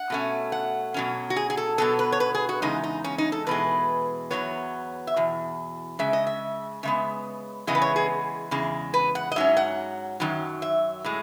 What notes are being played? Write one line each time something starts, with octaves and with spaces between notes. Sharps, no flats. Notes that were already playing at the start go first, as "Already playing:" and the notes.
Already playing: F#5
B2 A3 C#4
F#5
B2 F#3 C#4
F#4
G#4
G#4
A4
B2 F#3 B3 A4
B4
C#5
B4
G#4
F#4
E2 C#3 G#3 D#4
D#4
C#4
D#4
A4
E2 B2 G#3 B4
E2 B2 F#3 B3 C#5
E5
E2 B2
C#3 G#3 E5
D#5
E5
C#3 G#3 B3 E5
C#3 E3 G#3 B3 D#5
B4
C#5
G#4
E2 C#3 G#3
B4
F#5
D#5
G#2 F#3 C#4 E5
F#5
F#2 D#3 F#3
E5
A2 G#3